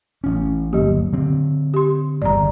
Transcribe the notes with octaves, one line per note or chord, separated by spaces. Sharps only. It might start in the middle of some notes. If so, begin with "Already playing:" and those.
A1 C#4
G1 D2 F#3 A#3 G4
D3 C4
G4 C6
G1 E2 G#2 D5 A#5